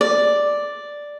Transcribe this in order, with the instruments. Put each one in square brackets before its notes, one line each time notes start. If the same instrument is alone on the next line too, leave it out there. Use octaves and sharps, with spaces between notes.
[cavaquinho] D5